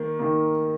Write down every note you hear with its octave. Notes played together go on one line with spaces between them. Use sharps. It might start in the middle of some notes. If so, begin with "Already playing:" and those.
Already playing: D#3 A#3
D#3 A#3